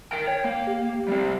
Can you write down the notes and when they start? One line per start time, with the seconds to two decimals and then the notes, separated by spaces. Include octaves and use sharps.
0.13 A#4 G5
0.27 C#5 G5
0.44 A#3
0.67 G4
1.08 G3 C4